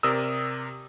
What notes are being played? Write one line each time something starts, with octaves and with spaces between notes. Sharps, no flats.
C3 A#4 D5 D#6 E6